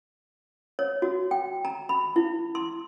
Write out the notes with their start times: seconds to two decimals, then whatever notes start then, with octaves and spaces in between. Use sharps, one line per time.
0.79 C#5
1.02 F#4
1.31 G5
1.65 A#5
1.89 B5
2.16 E4
2.55 C6